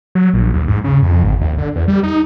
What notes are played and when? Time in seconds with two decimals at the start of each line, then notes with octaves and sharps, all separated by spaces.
0.15 F#3
0.34 A#1
0.54 D#2
0.68 G#2
0.84 C#3
1.03 F2
1.23 G#1
1.41 D#2
1.58 D3
1.76 E2
1.88 G3
2.03 D#4